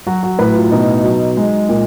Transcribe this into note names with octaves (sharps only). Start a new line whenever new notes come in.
F#3 F#4
F#4
A2 B4
F4
B2 D#4
F#3
G#3
A#2